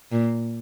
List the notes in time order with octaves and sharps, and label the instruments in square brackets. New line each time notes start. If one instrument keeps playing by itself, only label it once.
[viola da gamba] A#2